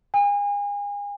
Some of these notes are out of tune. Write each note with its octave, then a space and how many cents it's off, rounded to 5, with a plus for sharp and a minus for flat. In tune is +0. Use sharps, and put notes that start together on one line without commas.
G#5 -35